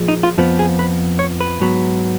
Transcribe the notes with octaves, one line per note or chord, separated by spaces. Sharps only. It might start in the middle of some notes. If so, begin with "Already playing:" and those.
Already playing: A#2 F3 G#3
D#4
F4
F2 F3 B3
G#4
B4
C#5
B4
G#2 F#3 B3